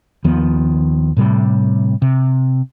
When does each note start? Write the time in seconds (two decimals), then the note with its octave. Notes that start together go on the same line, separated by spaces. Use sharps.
0.24 D#2 D#3 F3 B3
1.17 A2 C3 G3
2.02 C3